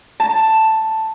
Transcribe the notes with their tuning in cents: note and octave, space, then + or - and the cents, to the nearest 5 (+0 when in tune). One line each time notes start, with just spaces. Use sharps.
A5 +5